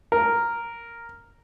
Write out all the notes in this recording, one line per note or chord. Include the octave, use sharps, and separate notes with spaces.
A#4